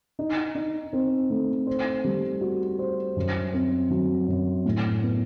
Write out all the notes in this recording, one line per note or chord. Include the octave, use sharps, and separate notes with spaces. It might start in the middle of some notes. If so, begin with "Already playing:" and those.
D#4
D#4
C4
A3
C5
G3
F#4
C5
F#2
C4
F#3
F#2
A2
B3